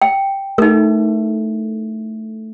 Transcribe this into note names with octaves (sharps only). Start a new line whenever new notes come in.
G5
A3 D#4 A#4